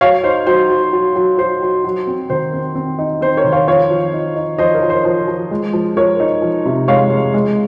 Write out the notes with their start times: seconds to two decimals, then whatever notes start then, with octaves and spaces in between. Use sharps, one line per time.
0.01 F#3 C#5 F5
0.24 D#4 C5
0.47 F#3 C5
0.70 F#3
0.93 F#3
1.16 F#3
1.38 F#3 C5
1.62 F#3
1.85 F#3
2.07 C4
2.30 D#3 C5
2.53 C4
2.75 C4
2.99 D#4
3.21 C4 C5
3.37 A#4 C#5
3.44 D#3
3.52 C#5 F5
3.68 F3 C#5 F5
3.91 F3
4.13 D#4
4.36 D#4
4.58 F3 C5 D#5
4.74 A#4
4.82 F3
4.90 C5
5.04 F3 C5
5.28 F3
5.51 G#3
5.73 F3
5.97 F3 A#4 C#5
6.20 D#4
6.42 F3
6.65 C3
6.88 G#3 C#5 F5
7.10 G#3
7.34 G#3